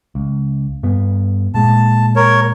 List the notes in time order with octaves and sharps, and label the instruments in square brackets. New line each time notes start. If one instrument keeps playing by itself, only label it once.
[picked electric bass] C#2
G2 B3
[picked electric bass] A#2 G#3 [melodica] A5
[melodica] A#4 C#5